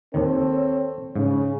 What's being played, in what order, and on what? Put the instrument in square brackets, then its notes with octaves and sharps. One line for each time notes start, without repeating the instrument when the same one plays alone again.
[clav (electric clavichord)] D#2 D#3 [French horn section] C4 A4 C#5
[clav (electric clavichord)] G#2 [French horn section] C#3